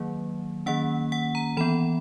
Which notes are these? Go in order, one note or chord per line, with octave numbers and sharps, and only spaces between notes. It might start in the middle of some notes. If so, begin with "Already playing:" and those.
Already playing: D#3 F#3 A#3
D#3 A#3 C#4 F#5
F#5
A#5
E3 B3 B5